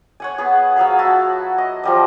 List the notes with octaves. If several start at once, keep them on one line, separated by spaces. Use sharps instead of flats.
C#5 F#5 G#5
B3 G#4
F#3 G#4 F5 B5
F#4 E5 A5
D#5
F3 G3 D#5